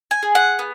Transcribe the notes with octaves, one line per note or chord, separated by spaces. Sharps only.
G#5
G#4
F#5
B3